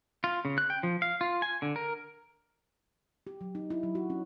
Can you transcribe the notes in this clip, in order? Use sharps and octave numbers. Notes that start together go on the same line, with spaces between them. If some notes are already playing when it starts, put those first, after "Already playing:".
F4
C#3
F#6
G5
F3
F5
F4
G#5
D3
A#4
G4
F#3
D#4
E4
F#3
F#4
C#4